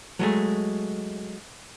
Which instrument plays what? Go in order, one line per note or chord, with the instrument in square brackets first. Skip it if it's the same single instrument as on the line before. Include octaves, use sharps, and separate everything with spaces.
[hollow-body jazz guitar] F#3 G#3 A3